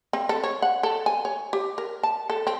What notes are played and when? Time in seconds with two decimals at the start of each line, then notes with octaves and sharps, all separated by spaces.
0.13 C4
0.29 A4
0.44 C#5
0.62 F#5
0.83 A4
1.06 G#5
1.25 C#5
1.53 G4
1.78 A#4
2.03 A5
2.30 A4
2.47 C4